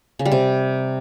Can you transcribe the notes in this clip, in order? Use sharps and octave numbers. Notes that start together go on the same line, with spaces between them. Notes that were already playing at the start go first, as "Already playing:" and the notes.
C#3
G3
C3